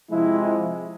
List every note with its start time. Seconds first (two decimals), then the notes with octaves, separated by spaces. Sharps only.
0.10 C3 F3 G#3 E4